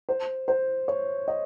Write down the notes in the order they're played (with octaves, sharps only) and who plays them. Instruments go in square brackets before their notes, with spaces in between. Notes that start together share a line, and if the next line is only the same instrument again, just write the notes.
[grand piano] C5
C5
C#5
D#5